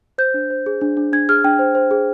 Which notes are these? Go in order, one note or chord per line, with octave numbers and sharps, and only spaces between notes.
C5 G6
D4
C5
G#4
D4
D4
D4 G#6
G#4 F6
D4 G5
C5
C5
G#4